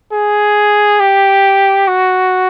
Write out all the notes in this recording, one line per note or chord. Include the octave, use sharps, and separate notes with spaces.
G#4
G4
F#4